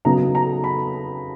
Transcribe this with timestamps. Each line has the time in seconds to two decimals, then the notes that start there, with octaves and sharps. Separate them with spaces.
0.05 C#3 F#3 B3 D#4 A#5
0.35 A#5
0.64 B5